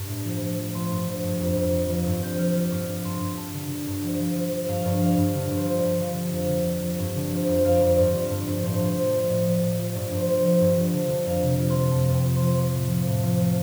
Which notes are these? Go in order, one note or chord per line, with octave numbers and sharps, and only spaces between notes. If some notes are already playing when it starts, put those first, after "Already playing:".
Already playing: G2
A2
F3
F3
F3
F3 C6
G2
F3
G2
F2
F2
F3
F3
G2
F3 G6
F3 F6
F3 F6
G2 D6
G2
G2 C6
G2
G2 A5
D3
D3
G2
F3
F3
F3
F3
G2 F5
G2 D5
F3 F5
G2
D3
G2
C5
F3
D5
G2
F3 F5
D3
F2
D3
F3
F3
G2
D3
F3 C5
F2
F2 F5
D5
F2 C5
G2 D5
F3
G2
G2
A2 C5
F3
C5
A2
D5
F3
A2 D5
F3
A2 D5
F3
G2 D5
G2
C5
F3
F3
G2
F3
D3
D3
F2 F5
C3
F3
C6
F3
F2 A5
F2
G5
F2
C6
F3
F3 D6
A2
F3
A2
F3
F3